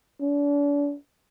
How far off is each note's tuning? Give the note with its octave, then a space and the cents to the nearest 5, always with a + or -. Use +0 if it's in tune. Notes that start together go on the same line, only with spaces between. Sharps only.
D4 -40